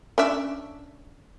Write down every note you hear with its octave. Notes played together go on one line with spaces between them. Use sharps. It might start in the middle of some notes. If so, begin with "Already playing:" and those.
C#4 D4 E5